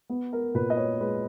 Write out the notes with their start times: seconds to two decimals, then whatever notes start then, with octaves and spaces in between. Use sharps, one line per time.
0.10 B3
0.33 A#4
0.55 A#2 B4
0.70 D#5
0.77 C#5
1.00 G#3 B4